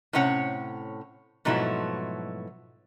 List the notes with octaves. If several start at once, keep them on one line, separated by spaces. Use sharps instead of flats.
A2 C3 C#4 C#5 F#5
G#2 B2 F3 F#3 A3 E4